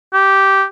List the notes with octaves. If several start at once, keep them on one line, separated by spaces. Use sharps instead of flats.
G4